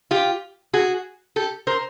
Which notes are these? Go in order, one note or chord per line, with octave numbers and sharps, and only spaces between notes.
F4 G4
F#4 G#4
G4 A4
A#4 C5